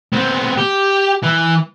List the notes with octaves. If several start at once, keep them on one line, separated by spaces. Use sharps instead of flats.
B3 C4
G4
E3